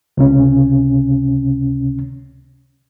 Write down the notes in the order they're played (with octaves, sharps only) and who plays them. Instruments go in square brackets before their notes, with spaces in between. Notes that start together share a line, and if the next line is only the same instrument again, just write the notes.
[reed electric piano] C#2 C3 C#4